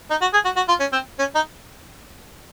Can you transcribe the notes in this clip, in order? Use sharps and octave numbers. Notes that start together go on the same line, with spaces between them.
D#4
F#4
G#4
F#4
F#4
F4
C#4
C4
C#4
D#4